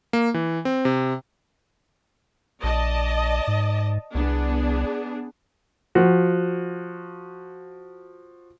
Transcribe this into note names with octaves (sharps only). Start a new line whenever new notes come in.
A#3
E3
C4
C3
A#1 D5 D#5 A5
G#2
C2 B3 D4 G#4
F3 F#4